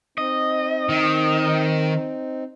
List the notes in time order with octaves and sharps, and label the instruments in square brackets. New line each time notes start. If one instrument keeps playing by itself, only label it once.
[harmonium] C4 D#4 [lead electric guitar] D#5
[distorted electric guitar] D#3